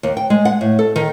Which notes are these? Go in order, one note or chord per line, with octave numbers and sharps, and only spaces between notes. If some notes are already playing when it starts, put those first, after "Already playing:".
D#2
G5
G#3
F#5
A2
A4
D#3